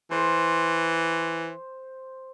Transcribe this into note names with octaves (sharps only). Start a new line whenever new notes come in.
E3 C5